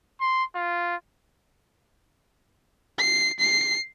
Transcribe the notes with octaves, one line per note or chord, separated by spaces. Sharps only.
C6
F4
C7
C7